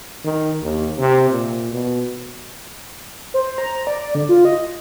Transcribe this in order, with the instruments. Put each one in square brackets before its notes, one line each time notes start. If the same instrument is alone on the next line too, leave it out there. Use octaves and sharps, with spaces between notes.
[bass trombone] D#3
D#2
C3
A#2
B2
[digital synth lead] C5
A#5
D5
D3
F4
D#5